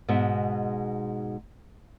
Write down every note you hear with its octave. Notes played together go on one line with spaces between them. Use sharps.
G#2 B2 G#3 E5